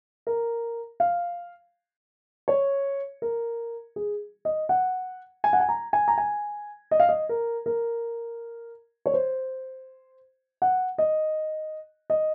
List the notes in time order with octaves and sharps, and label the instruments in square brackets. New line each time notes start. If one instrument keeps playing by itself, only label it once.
[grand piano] A#4
F5
C#5
A#4
G#4
D#5
F#5
G#5
F#5
G#5
A#5
G#5
A#5
G#5
D#5
F5
D#5
A#4
A#4
C#5
C5
F#5
D#5
D#5